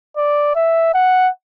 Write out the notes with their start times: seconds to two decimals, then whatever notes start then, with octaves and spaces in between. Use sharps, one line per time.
0.17 D5
0.55 E5
0.94 F#5